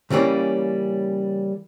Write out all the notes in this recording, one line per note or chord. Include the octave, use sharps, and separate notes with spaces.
C#3 E3 G3 A#3 C#4